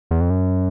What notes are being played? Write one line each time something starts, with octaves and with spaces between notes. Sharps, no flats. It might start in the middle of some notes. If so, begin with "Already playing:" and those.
E2
F2
F#2